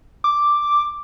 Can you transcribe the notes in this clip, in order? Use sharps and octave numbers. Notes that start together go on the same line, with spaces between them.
D6